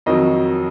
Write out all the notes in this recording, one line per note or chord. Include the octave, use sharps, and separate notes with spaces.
F2 D#3 F#3 D#5